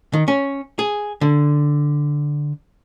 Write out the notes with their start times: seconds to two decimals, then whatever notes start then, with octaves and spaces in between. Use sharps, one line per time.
0.13 D#3
0.28 C#4
0.79 G#4
1.21 D3